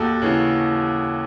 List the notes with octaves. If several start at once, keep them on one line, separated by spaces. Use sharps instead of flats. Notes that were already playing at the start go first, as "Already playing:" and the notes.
Already playing: D#2 F#4 A4
C#3 E3